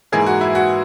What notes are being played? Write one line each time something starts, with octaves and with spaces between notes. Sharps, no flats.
G#2 E3 A#3 G#4
F#4
E4
F#4